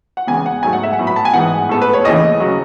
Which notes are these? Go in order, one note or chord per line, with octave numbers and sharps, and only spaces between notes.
F#5
E2 C#3 G#3 B3 G#5
F#5
G#2 F#3 A3 G#5
F#5
E5
F#5
A2 F#3 B3
B5
A5
G#5
G#2 E3 B3 F#5
A2 G#3 B3 A4
B4
C#5
D#2 C#3 E3 A3 D#5
C#3 F#3